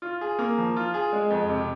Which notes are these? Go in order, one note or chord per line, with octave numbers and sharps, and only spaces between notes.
F4
G#4
A#3
F3
F4
G#4
G#3
F2
C3